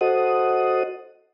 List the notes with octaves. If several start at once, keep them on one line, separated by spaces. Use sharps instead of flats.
F#4 A4 C5 D#5 F#5 D#6